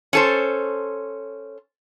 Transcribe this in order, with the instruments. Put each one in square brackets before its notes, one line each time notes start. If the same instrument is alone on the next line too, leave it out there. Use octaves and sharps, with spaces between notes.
[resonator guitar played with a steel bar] C#4 A4 C5